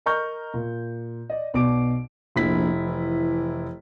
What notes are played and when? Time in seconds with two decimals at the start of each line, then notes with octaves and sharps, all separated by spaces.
0.06 A#4 D#5 A#5 C#6 F6 G6
0.54 A#2
1.30 D5 D#5
1.54 B1 B2 D5 D6 D7
2.36 F1 A#1 E4 B6
2.87 E3